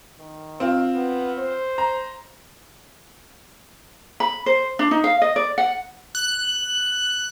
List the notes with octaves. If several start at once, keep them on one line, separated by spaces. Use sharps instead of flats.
D#3
C4 F4
B3
C5
A#5
B5
C5
D4
D#4
F5
D#5
D5
F#5
F#6